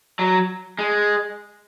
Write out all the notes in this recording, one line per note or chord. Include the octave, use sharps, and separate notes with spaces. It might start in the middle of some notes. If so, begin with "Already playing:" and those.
F#3
G#3